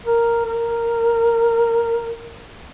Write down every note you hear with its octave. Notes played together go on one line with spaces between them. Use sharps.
A#4
A#4